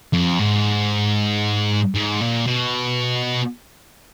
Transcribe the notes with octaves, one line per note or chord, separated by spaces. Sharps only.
F2
G#2
G#2
A#2
B2